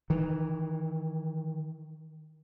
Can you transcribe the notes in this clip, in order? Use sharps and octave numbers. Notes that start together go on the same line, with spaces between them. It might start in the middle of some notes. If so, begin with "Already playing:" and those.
D#3 E3